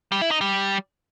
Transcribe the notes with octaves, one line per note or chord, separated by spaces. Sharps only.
G3
E4
D#4
G3